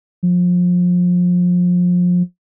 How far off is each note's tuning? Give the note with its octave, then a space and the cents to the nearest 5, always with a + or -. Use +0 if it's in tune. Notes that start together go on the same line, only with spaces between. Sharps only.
F3 +30